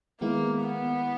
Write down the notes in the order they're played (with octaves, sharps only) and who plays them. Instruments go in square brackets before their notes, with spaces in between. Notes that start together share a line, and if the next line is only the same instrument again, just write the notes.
[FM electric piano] D#3 G#3 B3 E4 [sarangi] A#3
[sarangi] B3